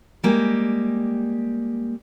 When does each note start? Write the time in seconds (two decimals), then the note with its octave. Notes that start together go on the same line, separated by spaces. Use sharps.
0.24 G3 G#3 A#3 G4